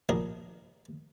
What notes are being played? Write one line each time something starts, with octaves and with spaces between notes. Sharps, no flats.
A#1 A#4 D#5